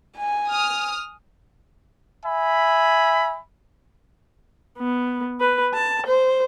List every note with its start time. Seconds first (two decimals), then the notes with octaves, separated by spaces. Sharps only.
0.18 G#5
0.48 D#6 F6
2.26 E5 G#5 B5
4.79 B3
5.41 B4
5.74 A5
6.06 C5